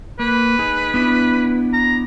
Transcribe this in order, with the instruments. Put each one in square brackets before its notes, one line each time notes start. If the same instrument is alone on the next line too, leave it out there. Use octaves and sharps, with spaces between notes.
[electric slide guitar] A#3 [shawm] B4
[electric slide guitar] D#4 G#4
B3 D4 E4
[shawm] A#5